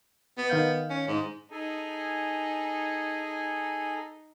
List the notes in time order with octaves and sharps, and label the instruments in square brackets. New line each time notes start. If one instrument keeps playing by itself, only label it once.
[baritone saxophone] B3
[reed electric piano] D#3 F5 G6
[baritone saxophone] C#4
G#2
[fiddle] D#4 [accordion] G#4 A4 G#5